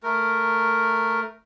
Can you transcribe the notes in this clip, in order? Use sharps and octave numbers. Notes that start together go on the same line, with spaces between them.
A3 A#4